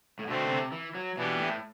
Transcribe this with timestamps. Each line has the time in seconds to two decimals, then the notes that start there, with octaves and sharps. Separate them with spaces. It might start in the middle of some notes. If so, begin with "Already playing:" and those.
0.19 A2
0.27 B2 D3 A3 C4
0.49 C3
0.72 E3
0.95 F#3
1.17 B2 E3 B3 D4 G4
1.39 A2